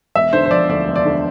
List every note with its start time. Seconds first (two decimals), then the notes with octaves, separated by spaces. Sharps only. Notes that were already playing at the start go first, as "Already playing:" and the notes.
0.15 E1 E5
0.33 D3 C5
0.45 C5
0.51 F3 D5
0.69 D2 D5
0.88 E1
0.96 D5
1.05 D3